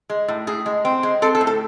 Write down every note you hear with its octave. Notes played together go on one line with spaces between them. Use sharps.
G#3
A2
A2 G#4
G#3
C4
G#3
C4 A4
A4
A2
A4